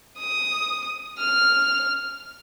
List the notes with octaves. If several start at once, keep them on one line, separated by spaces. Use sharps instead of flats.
D#6
F6